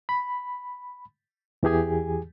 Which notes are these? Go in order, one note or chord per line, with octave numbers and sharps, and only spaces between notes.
B5
E2 E3 G4 G#4 G#5